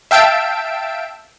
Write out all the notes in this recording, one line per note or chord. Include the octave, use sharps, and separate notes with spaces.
E5 F5 G5 A5 E6 D7